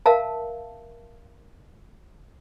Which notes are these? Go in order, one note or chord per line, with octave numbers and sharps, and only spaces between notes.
A#4 E5 F5 A5